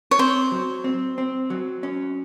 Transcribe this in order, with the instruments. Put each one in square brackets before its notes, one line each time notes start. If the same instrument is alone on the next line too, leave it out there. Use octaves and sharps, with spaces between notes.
[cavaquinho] C#5
[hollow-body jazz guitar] C4 [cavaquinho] C5
[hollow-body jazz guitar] F#3
C4
C4
F#3
C#4